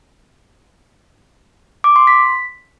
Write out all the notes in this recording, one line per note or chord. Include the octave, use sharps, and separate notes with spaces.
D6
C6
B6